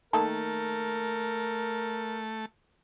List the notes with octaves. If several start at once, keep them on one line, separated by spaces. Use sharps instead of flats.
D#3 A3 A#3 A4 A#4